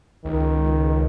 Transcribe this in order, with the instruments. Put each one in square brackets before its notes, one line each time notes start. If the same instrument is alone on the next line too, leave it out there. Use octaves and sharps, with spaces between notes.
[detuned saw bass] C#2 [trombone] D#3